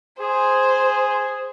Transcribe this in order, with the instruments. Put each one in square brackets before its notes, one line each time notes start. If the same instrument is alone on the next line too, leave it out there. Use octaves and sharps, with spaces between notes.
[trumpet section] G#4 [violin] C5